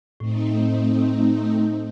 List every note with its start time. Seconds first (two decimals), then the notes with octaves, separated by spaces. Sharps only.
0.20 A2 A3 C4 D#4